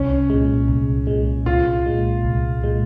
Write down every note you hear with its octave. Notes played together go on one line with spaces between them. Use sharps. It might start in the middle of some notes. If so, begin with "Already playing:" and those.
Already playing: C2 C#4
A#2 G#3
C2
A#2 G#3
C2 F4
A#2 G#3
C2
A#2 G#3